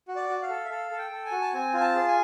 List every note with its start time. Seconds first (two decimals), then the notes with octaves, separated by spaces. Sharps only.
0.08 F#4
0.16 D5
0.29 F#4
0.42 F5
0.49 A4
0.65 E5
0.70 A4 F5
0.91 A4
0.98 G5
1.11 A4
1.25 G#5
1.32 F#4
1.41 A5
1.53 C4 G#5
1.73 F4 G#5
1.81 A5
1.95 G#4
2.08 G#5